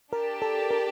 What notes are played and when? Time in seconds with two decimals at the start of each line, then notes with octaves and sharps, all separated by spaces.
0.12 D4 G4 A#4 D5 A5
0.42 A4
0.71 A#4